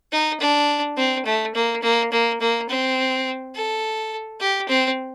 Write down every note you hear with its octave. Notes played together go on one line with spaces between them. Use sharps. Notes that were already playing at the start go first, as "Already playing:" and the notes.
D#4
D4
C4
A3
A#3
A#3
A#3
A#3
C4
A4
G4
C4